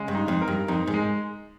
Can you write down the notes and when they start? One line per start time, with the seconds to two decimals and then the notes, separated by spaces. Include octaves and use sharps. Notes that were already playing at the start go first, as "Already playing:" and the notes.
Already playing: C#3 G#3
0.08 G2
0.15 D#4
0.28 F2
0.41 A#4
0.48 G2
0.68 F2 D#4
0.87 G#2
0.94 G#3